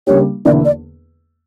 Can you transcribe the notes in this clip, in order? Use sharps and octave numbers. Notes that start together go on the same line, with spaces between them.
C#3 G3 A#3 D4 G4 C#5
E1 E2 D3 A#3 E4 D5
D5